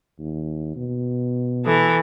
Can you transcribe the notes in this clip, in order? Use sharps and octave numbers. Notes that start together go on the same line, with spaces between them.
D#2
B2
E3 A4